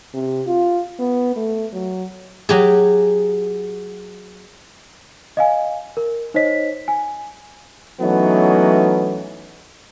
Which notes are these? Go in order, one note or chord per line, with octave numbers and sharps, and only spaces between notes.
C3
F4
B3
A3
F#3
F#3 G4 G#4
D#5 F5 G#5
A#4
D#4 C5 C#5 D#5 B6
G#5
E3 F#3 A3 B3 C#4 D#4